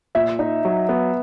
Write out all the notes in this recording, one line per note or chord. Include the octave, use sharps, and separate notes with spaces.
A#2 E5
D#4
F#3
B3